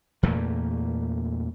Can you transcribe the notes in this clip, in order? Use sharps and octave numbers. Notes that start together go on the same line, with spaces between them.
E2 A#2 A3 A#3